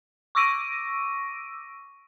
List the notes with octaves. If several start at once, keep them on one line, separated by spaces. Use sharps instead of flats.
C#6 D6 E6 A#6 D7 D#7